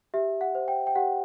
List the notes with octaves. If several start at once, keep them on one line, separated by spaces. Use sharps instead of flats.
G4 E5
F#5
C5
G5
G5
G4 F#5